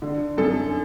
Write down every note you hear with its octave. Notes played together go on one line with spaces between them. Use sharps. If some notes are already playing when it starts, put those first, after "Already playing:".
D3
F#2 A4